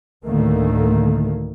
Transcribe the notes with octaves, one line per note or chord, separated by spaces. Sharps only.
D2 A2 D3 D#3 A3 A#3